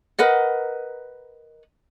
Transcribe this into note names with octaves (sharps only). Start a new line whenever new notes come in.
A#4 B4 D#5 F#5